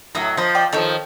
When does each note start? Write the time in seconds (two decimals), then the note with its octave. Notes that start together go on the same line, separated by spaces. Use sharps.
0.15 A2 F#3 D#5 E5 A#5
0.37 F3 C5 D#5
0.55 D5 D#5 G5
0.73 D#3 F3 A4 C#5 G5